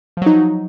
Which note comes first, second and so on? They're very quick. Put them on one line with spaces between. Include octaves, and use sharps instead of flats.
F3 F#3 D#4